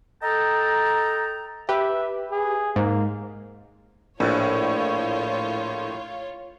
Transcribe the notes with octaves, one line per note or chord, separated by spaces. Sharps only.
A4 D#5 G5 A5 A#5
G4 B4 E5
G#4
G#2 A#3
A#1 A2 F4 C#5